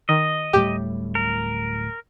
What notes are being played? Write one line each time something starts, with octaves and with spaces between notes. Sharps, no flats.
D#3 D#5
D1 A2 G3 G4
A#4